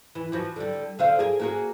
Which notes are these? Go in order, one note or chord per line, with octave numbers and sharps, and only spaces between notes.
E3
E3 F3 F#4
D3 G3
D3 C5 F5
G#4 A#4
A#3 F#4 G#4